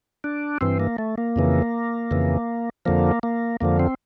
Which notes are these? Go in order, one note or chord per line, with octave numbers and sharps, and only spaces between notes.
D4
G2 E3 C4
A#3
A3
A#3
F2 C#3 E3
F2 C#3 E3
F2 D3 F3 A#3
A#3
F2 D3 F3 A#3
C4